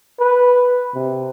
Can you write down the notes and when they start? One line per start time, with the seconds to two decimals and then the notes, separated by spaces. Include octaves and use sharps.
0.20 B4
0.94 C3